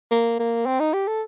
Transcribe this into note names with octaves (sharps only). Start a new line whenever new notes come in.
A#3
A#3
C4
D#4
G4
A4